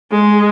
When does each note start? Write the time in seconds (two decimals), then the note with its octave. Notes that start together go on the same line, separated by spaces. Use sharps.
0.11 G#3